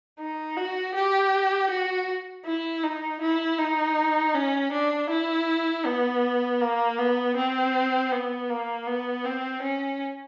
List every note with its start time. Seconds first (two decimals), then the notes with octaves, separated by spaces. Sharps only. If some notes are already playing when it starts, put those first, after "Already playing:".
0.19 D#4
0.57 F#4
0.94 G4
1.70 F#4
2.45 E4
2.83 D#4
3.21 E4
3.58 D#4
4.34 C#4
4.72 D4
5.10 E4
5.85 B3
6.61 A#3
6.98 B3
7.36 C4
8.12 B3
8.50 A#3
8.87 B3
9.25 C4
9.62 C#4